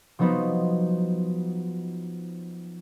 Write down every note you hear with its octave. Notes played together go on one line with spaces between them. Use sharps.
F3 F#3 B3 D#4 B4 C5